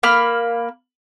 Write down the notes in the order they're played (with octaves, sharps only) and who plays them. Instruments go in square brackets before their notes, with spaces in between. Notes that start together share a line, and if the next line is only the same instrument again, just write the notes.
[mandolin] A#3 B5 F6